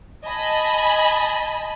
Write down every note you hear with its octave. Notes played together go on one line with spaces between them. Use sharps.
D#5 G#5 A5 B5